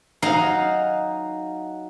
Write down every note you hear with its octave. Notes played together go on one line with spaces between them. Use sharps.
F#3 D#4 F5 G#5 A#5